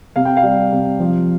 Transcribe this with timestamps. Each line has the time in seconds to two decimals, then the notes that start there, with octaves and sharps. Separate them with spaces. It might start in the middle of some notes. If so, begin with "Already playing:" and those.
0.16 C3 F5
0.25 G5
0.37 F5
0.43 G3
0.72 C3
1.00 F3